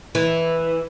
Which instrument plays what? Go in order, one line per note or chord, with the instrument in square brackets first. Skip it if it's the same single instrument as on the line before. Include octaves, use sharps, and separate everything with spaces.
[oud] E3